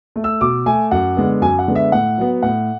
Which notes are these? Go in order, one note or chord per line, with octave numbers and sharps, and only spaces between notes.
A3
E6
B2 D6
A3 G#5
F#2 F#5
D3 G#3 B3
F#2 G#5
F#5
D3 G#3 B3
E5
A2 F#5
F#3 B3
A2 F#5